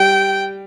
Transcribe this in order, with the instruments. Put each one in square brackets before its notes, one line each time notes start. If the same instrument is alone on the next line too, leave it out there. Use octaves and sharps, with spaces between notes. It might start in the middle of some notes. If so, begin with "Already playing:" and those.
Already playing: [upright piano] G3 [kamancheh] G5